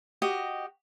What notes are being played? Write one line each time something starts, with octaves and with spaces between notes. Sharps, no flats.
F#4 G4 D#5